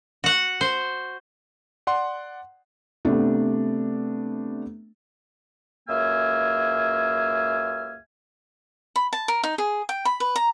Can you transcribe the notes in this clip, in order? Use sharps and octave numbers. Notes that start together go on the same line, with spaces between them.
F#4 F#5
C5
D5 F#5 C6
C3 A3 B3 D4
C#2 F#2 A#3 E5 G#5 F6
B5
A5
A#4
D#4
G#4
G5
B5
B4
A#5